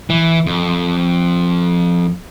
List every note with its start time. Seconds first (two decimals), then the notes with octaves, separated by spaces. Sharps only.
0.10 E3
0.46 F2